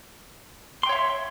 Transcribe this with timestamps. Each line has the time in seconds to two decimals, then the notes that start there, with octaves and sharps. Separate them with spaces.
0.83 C6
0.86 G5
0.89 C#5
0.92 F5
0.95 E5